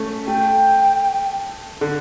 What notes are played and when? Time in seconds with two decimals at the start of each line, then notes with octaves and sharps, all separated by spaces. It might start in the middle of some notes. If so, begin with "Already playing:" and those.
Already playing: A3 C#4
0.27 A3 G5
1.81 D3